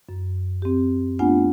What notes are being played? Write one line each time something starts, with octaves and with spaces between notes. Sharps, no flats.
F#2
C4 G4
A3 B3 D4 F4 F#5 G#5